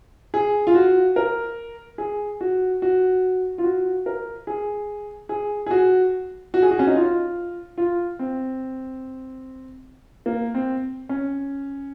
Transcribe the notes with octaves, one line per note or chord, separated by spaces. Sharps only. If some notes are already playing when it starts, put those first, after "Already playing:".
G#4
F4
F#4
A#4
G#4
F#4
F#4
F4
F#4
A#4
G#4
G#4
G#4
F#4
F#4
G#4
F#4
C#4
D#4
F4
F4
C4
A#3
C4
C#4